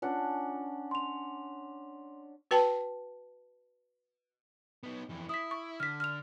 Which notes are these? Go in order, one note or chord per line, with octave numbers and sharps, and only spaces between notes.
C#4 D4 F4 F#5 A5
C6 F7
F#4 B4 G5 A5
B3 D#4
F2 E3
E4 D#6 B6
C#6
D3 F6 B6
F6 F7